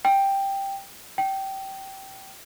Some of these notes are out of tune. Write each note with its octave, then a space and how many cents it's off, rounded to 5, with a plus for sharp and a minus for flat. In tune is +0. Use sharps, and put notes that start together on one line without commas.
G5 +5
G5 -20